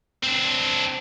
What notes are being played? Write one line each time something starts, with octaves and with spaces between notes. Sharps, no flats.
C4 D4